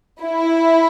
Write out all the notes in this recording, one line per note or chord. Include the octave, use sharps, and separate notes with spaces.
E4